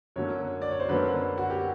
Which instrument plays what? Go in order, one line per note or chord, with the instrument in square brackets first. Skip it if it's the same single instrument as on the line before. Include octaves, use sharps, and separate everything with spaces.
[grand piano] F#2 D3 F#3 A#3 C#5
D5
C#5
C5
F#2 D3 F#3 A#3 B4
F#4
G4